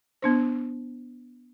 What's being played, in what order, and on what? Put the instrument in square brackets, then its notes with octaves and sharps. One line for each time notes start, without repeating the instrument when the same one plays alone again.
[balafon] B3 D4 C5